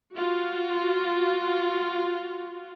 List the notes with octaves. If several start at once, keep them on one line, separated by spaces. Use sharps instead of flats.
F4 F#4